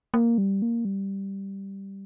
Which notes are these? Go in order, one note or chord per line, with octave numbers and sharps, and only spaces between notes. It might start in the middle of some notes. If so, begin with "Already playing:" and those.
A#3
G3
A#3
G3